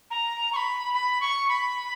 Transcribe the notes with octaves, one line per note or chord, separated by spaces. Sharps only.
A#5
C#6
B5
B5
C#6
B5